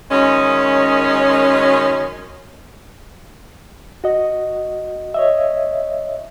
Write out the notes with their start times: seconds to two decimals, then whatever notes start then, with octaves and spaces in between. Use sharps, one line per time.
0.11 F#2 D#3 G#3 C#4
4.04 F#4 D#5
5.14 C#5 D#5 E5